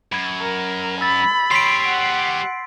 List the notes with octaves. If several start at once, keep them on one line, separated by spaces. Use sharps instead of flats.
F#2 B5 G#6
A#4
B5 E6 A6
G4 C#5 C6 B6 C7 D7
F#5